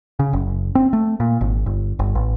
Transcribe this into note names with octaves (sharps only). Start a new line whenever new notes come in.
C#3
F#1
C4
A3
A#2
G#1
G1
G1
A1